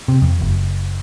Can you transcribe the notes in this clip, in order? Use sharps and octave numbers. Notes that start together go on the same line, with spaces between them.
C3
F2
F#1